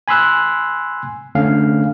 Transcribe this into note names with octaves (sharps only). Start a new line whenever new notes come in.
G#5 B5 C6 E6 F#6
D3 A3 C#4 F5